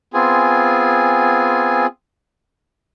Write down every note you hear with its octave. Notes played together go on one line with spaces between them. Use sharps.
B3 C4 F4 G#4 G#5